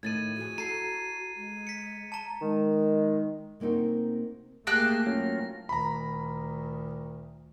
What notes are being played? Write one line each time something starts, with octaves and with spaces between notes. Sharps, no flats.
A2 D#3 G#6 A6 D#7
F3 F#4 G#4
A4 A#5 C7 D#7
G#3
B6 C#7
A5 A#5
D#3 G#3
C3 A#3 C4 D#4 F#4
A3 A#3 G4 G#4 G5 A5 F#6 A#6
F#3 C#4 F4
D2 A#2 D#3 A#5 B5